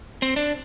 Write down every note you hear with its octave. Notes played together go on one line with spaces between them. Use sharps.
C4
D4